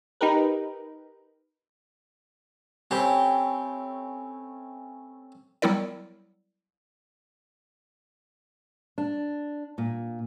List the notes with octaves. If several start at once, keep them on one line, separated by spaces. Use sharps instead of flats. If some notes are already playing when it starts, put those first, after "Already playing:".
D#4 G4 A#4 B4
A3 C4 C#4 G4 G#5 A5 B5
F#3 G3 B3 E4 A#4 D5
D4
A#2